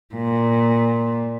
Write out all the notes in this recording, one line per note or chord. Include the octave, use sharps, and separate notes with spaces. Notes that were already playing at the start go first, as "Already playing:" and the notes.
A#2